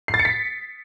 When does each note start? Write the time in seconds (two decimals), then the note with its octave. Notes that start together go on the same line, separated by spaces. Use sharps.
0.08 C7
0.14 A6
0.19 C#7
0.25 B6